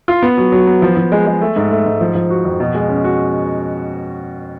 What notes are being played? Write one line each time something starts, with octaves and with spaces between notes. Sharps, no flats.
F4
B3
F#3
F#3
B3
F3
F3
G#3
G#3
A3
G#2
A3
G#2
F3
F3
F#4
F2
B2
G#3
C#4
F#4